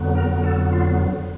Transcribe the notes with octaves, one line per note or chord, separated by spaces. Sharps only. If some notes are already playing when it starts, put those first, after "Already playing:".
Already playing: F2 D3 F#3 B3
A#4
A4
F4